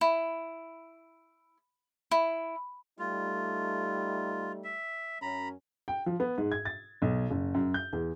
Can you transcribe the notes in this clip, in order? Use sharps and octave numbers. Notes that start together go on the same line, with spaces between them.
E4
E4
G3 A3 D#4 F4
E5
F#2 C#4 A#5 B5
G5
F3
B3
G#2
G#6
A6
B1
F#1
F#2
G6
E2